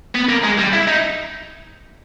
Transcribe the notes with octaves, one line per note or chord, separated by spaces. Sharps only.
B3
A#3
G#3
G3
E4
D#4